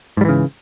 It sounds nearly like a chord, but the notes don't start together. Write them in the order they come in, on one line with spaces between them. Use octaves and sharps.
G#2 G3 E3 C#3